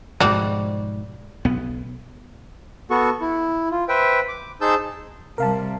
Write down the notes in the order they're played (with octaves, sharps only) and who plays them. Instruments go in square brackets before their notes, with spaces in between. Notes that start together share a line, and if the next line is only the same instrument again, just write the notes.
[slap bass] G#2 B2 F3 [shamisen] G3 F#4 D5
[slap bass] B1 B3
[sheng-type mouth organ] B3 F#4 A4 C#6
E4
F4
B4 C5 E5 G5
D6
D#4 G#4 C5 A5 E6 G6
[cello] C3 G3 [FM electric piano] A#4 F5 A5